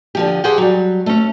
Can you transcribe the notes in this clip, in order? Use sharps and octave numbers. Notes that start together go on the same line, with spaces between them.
D3 F3 G4
G4 G#4 C5 F#5 G5
F#3 G3
A3 C#4